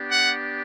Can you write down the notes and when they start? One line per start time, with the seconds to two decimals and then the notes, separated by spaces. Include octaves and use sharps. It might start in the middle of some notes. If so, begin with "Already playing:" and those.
Already playing: B3 D4 G4
0.11 F#5